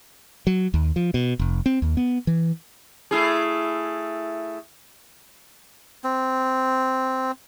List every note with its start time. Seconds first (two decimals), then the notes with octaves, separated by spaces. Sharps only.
0.47 F#3
0.74 D#2
0.96 F3
1.14 B2
1.39 F1
1.66 C4
1.82 D#2
1.97 B3
2.27 E3
3.11 A3 E4 G#4
6.04 C4